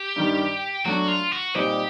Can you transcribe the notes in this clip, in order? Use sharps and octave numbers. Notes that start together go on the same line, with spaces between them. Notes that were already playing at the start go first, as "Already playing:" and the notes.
Already playing: G4
G2 D#3 G3
F#3 A3 D4 F#4
F4
F#4
A#2 G3 C4 D#4 G4